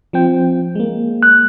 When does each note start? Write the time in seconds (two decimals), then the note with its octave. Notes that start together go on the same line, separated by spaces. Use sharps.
0.13 F3 C4 G5
0.75 G#3 A#3
1.23 F#6